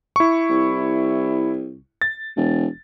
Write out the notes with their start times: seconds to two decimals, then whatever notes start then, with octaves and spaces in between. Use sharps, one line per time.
0.16 E4 C#6
0.50 C2
2.02 A6
2.37 E1